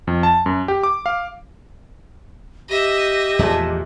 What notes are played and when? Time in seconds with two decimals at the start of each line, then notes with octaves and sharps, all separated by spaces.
0.07 F2
0.23 A5
0.46 F#2
0.68 G4
0.84 D6
1.06 F5
2.69 G4 D#5 E5
3.39 E2 A#2 F3 G#3 A3